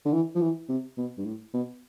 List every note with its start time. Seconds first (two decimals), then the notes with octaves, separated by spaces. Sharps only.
0.05 D3
0.13 E3
0.35 F3
0.41 E3
0.69 C3
0.97 B2
1.18 G2
1.25 A2
1.53 B2